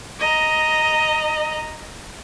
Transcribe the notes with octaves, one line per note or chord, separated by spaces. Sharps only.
D#5 A#5